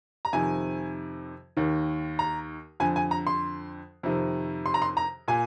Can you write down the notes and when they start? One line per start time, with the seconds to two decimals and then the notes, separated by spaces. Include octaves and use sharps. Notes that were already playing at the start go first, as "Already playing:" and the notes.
0.25 A#5
0.33 F2 C3 D#3 G#5
1.57 D#2 D#3
2.19 A#5
2.80 F2 D3 G#5
2.96 G#5
3.11 A#5
3.27 C6
4.03 F2 C3 D#3
4.66 C6
4.74 A#5
4.82 C6
4.97 A#5
5.28 A#2 G#5